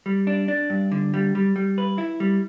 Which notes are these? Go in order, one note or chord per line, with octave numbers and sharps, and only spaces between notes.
G3
D4
D4
G2
D3
G3
G3
G3
B4
E4
G3